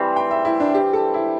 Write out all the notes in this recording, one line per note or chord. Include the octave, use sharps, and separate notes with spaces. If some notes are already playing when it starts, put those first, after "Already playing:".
Already playing: E3 G3 C4 E5
G5
E5
E4
D4
G4
A4
E4